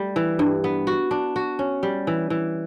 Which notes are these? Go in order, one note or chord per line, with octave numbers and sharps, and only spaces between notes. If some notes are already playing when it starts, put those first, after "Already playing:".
Already playing: G3 A3
E3
G2
B3
F#4
D4
F#4
C#4
G3
E3
E3